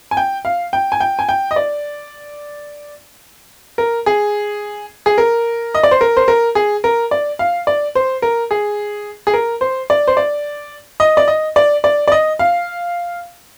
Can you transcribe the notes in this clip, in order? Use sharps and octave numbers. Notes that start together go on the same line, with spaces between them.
G#5
G5
F5
G5
G#5
G5
G#5
G5
D#5
D5
A#4
G#4
G#4
A#4
D#5
D5
C5
A#4
C5
A#4
G#4
A#4
D5
F5
D5
C5
A#4
G#4
G#4
A#4
C5
D5
C5
D5
D#5
D5
D#5
D5
D5
D5
D#5
F5